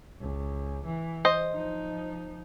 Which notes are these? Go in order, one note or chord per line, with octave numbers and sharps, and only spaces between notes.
C#2
E3
C5 D#5
F3 D#4